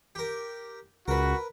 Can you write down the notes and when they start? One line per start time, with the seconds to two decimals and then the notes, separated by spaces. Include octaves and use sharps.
0.15 G4 A#4
1.08 C#2 F#4 A#4 B4